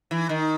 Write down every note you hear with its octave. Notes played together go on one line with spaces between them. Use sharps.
E3
D#3